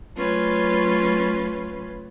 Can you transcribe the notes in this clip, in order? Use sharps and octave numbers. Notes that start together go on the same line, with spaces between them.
F#3 A3 C#4 F4 B4